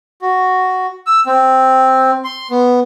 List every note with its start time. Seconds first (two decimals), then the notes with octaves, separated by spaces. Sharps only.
0.22 F#4
1.07 E6
1.26 C4
2.24 C6
2.51 B3